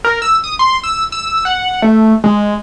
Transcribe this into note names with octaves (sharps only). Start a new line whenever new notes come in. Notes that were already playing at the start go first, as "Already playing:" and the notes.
A#4
E6
D#6
C6
E6
E6
F#5
A3
G#3